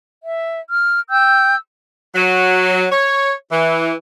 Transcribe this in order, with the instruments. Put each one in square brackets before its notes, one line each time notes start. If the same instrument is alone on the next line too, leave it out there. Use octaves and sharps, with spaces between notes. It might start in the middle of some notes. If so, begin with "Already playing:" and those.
[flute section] E5
F6
G5 E6 G6
[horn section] F#3
C#5
E3